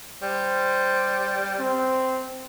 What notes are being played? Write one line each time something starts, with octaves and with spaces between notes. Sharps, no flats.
G3 C5
C4